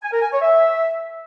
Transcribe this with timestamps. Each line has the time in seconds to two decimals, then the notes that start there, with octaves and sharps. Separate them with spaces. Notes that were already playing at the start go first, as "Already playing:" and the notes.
0.03 G#5
0.12 A#4
0.22 G#5
0.32 C#5
0.42 E5